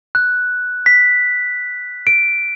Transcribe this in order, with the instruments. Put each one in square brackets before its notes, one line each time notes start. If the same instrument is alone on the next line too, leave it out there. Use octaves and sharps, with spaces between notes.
[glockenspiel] F#6
B6
D7